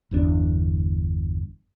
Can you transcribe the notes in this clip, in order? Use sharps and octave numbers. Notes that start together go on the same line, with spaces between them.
G1 E2 D3 D4